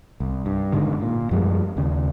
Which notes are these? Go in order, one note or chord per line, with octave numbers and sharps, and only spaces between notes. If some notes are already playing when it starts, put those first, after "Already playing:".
C2
G2
G1 G#2 D3 D#3
A#2
F#2 F3 G3 G#3
D#2 C#3